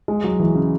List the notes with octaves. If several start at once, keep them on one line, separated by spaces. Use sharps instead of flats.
G#3
F#3
E3
C#3